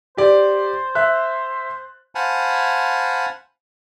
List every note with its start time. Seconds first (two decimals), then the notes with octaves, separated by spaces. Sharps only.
0.17 G4 C5 D5
0.95 E5 F#6
2.15 C5 F5 F#5 G#5 A5 B5